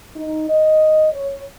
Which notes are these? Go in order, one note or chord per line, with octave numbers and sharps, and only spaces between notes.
D#4
D#5
C#5